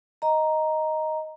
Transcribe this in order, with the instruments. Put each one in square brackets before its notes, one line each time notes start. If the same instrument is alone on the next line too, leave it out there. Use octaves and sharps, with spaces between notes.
[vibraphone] D#5 A#5